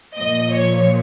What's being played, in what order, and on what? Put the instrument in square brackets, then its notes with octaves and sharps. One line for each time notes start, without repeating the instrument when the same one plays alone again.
[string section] A#2 F3 D#5
C#5